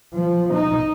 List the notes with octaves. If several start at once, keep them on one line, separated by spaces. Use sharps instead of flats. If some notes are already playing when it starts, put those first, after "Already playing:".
F3
D#4